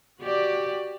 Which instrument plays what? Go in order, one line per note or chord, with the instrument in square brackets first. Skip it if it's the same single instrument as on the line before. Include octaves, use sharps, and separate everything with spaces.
[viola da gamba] F#4 G4 D5